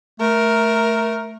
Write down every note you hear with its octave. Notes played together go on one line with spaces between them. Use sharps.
A3 A#4